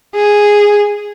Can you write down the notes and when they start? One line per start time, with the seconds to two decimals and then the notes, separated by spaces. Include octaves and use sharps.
0.16 G#4